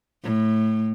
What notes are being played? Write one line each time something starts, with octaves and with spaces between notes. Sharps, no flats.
A2